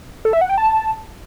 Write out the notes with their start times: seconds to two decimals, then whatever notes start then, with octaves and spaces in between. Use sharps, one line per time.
0.25 A4
0.33 E5
0.41 F#5
0.49 G5
0.58 A5